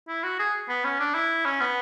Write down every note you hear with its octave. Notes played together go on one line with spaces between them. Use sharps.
E4
F#4
G#4
B3
C#4
D4
E4
C#4
B3